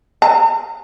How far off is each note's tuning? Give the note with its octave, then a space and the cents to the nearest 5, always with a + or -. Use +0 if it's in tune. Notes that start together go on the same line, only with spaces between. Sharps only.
A#5 -45